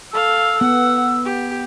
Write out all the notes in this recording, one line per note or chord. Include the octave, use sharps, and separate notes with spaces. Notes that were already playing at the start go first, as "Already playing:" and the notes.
A4 F5 E6
B3 F#5
G4